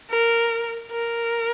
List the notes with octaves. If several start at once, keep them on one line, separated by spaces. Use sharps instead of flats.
A#4
A#4